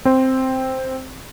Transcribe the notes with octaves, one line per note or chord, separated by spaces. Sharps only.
C4 C5